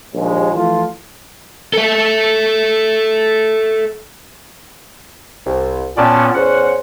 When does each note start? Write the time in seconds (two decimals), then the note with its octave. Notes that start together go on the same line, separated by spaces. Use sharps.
0.15 A#1 D#2 G#3
0.55 E3 F3 A3 F4
1.73 A4 E5
5.46 C2
5.97 A#2 B3 C#4 D5 G5 A5
6.34 E2 C#4 C5 F#5